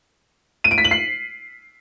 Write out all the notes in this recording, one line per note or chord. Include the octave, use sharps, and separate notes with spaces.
D#7
D7
B6
F#7
C7